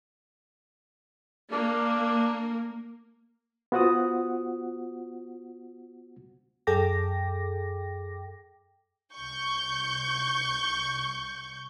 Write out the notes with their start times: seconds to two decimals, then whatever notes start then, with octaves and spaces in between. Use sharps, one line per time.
1.52 A#3 D4
3.72 B3 F4 F#4 C5 F#5 D#6
6.67 F#2 G#4 A4 G5 D6 A#6
9.15 C2 C#6 G6